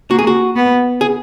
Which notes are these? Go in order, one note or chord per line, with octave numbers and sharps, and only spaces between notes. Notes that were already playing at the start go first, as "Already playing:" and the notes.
A#3 F#4
G#4
F#4
B3
G#4